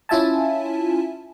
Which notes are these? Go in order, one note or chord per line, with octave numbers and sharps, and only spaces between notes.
C#4 E4 F4 E5 G#5 A5